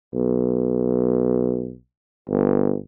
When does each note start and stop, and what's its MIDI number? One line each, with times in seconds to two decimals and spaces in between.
0.13 1.74 35
2.29 2.76 31